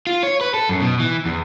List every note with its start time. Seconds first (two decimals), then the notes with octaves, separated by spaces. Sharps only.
0.07 F4
0.23 C#5
0.41 B4
0.54 A4
0.69 F#2
0.80 B2
0.99 E3
1.25 E2